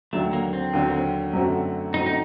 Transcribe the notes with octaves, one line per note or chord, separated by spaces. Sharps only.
D#2 D3 F#3 A3
A#3
C4
D#2 D3 F#3
F#2 D3 A3 C4 F#4
F#2 D3 A3 C4 D#4 F#4
D#4